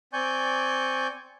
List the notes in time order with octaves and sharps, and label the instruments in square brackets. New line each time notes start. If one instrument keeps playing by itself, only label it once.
[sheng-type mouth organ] C4 D5 G#5 C#6 G6